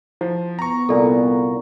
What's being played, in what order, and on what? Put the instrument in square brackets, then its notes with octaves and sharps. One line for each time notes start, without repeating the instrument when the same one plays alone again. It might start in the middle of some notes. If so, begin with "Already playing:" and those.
[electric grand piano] F3 [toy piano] E4 C5 F#5
[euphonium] B3 [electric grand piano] A#5 C#6
[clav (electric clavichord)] C2 A#2 [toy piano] A4 D5